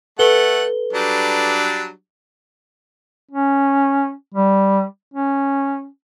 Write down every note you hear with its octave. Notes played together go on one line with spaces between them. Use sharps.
A3 A4 B4 F#5 G7
F#3 G3 D4
C#4
G3
C#4